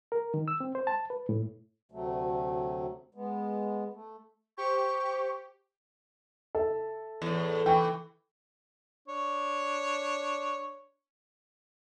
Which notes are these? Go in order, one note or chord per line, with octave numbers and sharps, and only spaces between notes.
A#4
D#3
E6
C4
C5
A5
B4
A2
D2 C3 F#3 A3
G#3 B3
A3
G4 C5 C#6
A4 E5
E2 A2
E3 G5 C#6
D4 C#5